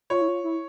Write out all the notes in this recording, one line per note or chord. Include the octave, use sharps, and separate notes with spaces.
F4 C#5
E4
F4
E4